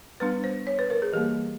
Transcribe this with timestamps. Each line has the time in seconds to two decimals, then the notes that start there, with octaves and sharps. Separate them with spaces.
0.20 G3 B3 D4 B4
0.44 C5
0.67 C#5
0.79 B4
0.90 A#4
1.02 G#4
1.13 E3 G3 A#3 G4